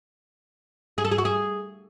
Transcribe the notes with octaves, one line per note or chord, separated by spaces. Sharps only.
G#4
A4
G#4
F#4
G#4